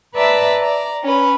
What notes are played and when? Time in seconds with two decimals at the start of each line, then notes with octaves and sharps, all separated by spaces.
0.15 B4 D5 E5 A5 A#5
0.61 D5 A#5
1.04 C#4 B4